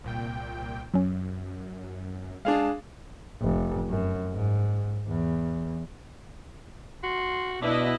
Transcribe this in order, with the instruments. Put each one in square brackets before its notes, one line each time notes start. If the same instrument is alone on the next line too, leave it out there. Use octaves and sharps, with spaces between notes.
[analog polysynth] C2 A#2 G5
[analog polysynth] F#2 [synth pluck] F#3 C#4
[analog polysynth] G#3 A5 [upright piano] D4 G#4 F5
[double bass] F1
F#2
G#2
E2
[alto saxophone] F#4 [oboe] C6
[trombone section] B2 [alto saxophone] D4 [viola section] E4 B4 D#5 [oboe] E5